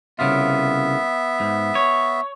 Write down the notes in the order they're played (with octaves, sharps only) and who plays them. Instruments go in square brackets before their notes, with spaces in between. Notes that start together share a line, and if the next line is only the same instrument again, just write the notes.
[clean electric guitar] C2 C#3 F4 [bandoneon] B3 E5
[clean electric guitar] G#2
C#5